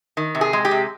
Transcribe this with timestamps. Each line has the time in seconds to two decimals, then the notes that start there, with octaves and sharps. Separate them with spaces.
0.17 D#3
0.35 C3
0.41 G#4
0.53 G#3
0.65 G4
0.71 C3